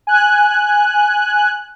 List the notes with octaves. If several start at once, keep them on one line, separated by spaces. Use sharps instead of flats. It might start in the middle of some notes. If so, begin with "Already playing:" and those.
G#5 F#6